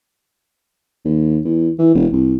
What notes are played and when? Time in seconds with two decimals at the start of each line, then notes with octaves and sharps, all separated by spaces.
1.05 D#2
1.45 E2
1.79 E3
1.95 E1
2.13 C2